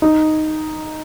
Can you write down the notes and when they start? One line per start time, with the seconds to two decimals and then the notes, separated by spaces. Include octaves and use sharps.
0.02 D#4